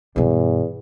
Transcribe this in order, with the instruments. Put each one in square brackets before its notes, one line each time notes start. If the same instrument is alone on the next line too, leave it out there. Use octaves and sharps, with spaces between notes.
[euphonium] E2 [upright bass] G2 B2